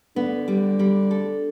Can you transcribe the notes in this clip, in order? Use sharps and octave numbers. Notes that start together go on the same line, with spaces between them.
D3 B3
G3
G3
A4